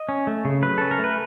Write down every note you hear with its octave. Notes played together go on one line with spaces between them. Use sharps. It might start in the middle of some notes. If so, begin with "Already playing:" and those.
Already playing: D#5
C#4
A3
C#3
F#3 B4
C#4 A4
A#4
A3
B4